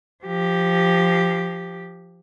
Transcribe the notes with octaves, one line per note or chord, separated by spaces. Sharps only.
F3 G4